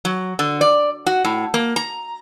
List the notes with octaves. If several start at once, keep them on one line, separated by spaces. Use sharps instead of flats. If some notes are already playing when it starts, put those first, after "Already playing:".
F#3
D3
D5
F#4
A2
A#3
A#5